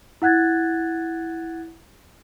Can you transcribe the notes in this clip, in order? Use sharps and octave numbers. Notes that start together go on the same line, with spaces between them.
E4 F#5 F#6 G#6 A6